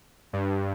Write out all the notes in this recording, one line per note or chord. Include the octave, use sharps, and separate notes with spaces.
G2